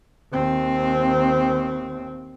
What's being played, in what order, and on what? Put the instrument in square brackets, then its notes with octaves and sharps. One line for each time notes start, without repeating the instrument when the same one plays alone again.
[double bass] D#2 C4